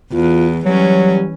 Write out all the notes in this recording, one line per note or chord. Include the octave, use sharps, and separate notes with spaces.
E2 F4
E3 F#3 G3 C#4